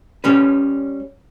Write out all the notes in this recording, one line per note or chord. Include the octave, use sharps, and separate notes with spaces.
G3 C#4 B4